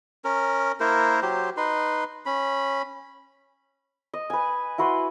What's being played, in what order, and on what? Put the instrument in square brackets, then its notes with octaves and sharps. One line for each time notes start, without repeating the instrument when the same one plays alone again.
[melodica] C#4 A#4
A#3 E4 A#4 C5
F#3 G4 C5
D#4 B4 C6
C#4 B5
[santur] D#5
B4 G#5
E4 F#4 B4 C6